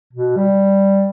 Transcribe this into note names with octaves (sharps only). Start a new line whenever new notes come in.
B2
G3